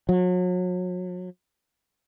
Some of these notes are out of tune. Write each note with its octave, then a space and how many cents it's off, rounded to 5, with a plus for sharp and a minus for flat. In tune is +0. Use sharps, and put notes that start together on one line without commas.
F#3 -35